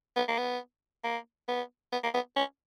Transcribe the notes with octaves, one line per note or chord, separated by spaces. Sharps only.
B3
A#3
B3
A#3
B3
B3
A#3
B3
C#4